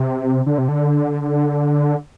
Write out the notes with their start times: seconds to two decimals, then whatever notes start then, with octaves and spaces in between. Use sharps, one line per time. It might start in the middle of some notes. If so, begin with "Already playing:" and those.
Already playing: C3
0.46 D3
0.58 C3
0.68 D3